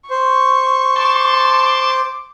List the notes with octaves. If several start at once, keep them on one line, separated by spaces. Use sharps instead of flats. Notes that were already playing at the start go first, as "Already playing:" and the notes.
C5 C#6
A5 C6 D6